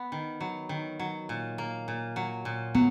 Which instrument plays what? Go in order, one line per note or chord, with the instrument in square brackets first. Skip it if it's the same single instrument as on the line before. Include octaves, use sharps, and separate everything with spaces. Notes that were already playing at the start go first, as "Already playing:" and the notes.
Already playing: [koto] B3
D#3
F#3
D#3
F#3
A#2
A#3
A#2
F#3
A#2
[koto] F#3 [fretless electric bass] B3